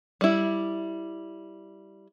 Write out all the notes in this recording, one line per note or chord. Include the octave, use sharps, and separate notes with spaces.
G3 E4